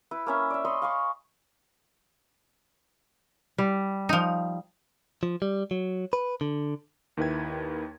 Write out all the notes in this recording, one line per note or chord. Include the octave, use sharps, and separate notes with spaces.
E4 B4
A#3 C#4 E5
D5 E5
C#5 D#5 B5 C6
F5 G#5 C#6
G3
F3 D#4
F3
G3
F#3
B4
D3
D#2 D#3 E4 B4 G5 G#6